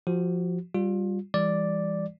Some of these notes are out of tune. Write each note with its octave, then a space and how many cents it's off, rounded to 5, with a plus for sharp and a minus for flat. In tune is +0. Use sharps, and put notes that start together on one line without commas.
F3 +5 F#4 +25
G3 +0 F4 +25
E3 +20 G3 +35 D5 +0